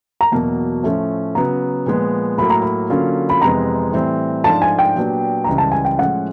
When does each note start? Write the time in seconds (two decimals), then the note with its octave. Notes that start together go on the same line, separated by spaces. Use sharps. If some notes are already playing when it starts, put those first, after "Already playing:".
0.21 A#5
0.32 E2 B2 F#3 A#3 A5
0.83 A2 F3 A3 C#4
1.35 C#3 F#3 B3 A#5
1.86 A#2 F3 G#3 B3
2.38 A2 F#3 A#3 B5
2.50 A#5
2.62 B5
2.90 D3 F#3 A#3 C#4 F4
3.30 B5
3.42 F2 C3 E3 G#3 B3 A#5
3.93 A2 E3 G3 C4
4.44 G#2 F3 A3 D4 F4 A5
4.62 G#5
4.79 G5
4.96 A#2 F#3 B3 D4 G4
5.44 C#2 C#3 E3 G3 A#5
5.58 A5
5.72 G#5
5.85 G5
5.98 A2 F3 G#3 C#4 F#5